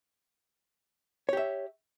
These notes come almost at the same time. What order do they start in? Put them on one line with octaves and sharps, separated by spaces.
C#5 G4 E5